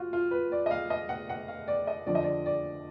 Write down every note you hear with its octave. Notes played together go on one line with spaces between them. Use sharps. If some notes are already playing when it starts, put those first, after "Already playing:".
Already playing: F4 F#4
F4
B4
D5
D#5
F5
D#5
F#5
F#5
F5
D5
D#5
F2 D3 F3 D5
D#5
D5
D5